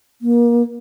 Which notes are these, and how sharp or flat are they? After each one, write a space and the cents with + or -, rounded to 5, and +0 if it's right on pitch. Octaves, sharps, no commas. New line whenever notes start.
A#3 +30